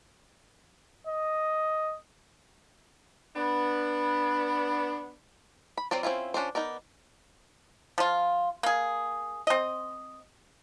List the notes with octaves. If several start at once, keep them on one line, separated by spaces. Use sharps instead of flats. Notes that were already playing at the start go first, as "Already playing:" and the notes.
D#5
B3 D4
B5
F#3 C4 F4 C5 D5
C4 C#4 E4 F4
C#4 D4 F4 C5
B3 D#4 A#4 D5
F3 F4
A#3 G#4
C4 D#5